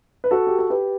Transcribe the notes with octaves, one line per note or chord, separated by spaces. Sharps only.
B4
F#4 A4
G4
A4
G4 B4